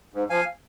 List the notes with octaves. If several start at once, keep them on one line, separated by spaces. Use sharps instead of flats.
G#2
F3 F5 G#5